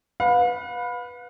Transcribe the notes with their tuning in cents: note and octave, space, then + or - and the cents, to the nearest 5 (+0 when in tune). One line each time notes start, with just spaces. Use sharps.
B4 +0 F5 +40